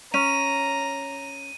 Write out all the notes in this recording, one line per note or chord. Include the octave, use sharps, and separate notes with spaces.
C#4 A#5 D#7